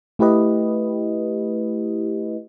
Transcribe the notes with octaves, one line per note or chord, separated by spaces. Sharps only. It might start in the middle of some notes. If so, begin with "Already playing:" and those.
A3 E4 G4 B4 D#5